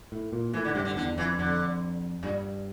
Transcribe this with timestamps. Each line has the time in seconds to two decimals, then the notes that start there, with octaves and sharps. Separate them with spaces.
0.12 A2
0.33 A#2
0.53 A2 E3
0.65 D3
0.75 G2 C3
0.85 D3
0.96 E2 D3
1.17 F2 E3
1.39 F2 D3
2.23 G2 A#2